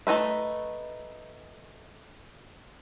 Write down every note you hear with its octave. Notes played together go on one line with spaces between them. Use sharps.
A3 D#4 B4 E5